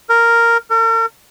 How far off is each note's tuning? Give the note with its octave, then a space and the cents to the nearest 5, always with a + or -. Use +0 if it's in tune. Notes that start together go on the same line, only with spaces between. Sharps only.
A#4 -5
A#4 -45